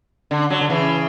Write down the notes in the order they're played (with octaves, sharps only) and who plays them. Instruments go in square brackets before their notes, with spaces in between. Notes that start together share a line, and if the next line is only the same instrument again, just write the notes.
[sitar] D3
D3 F#3
D3
C#3 E3